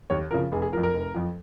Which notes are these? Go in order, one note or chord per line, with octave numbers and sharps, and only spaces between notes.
D#2 C#5
C#3 F3 A#4
F1 G#4
G#4
F2 F3 A#4
A#4
F1
F2 F3